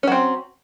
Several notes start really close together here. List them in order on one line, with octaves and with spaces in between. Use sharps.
C#4 F#3 C4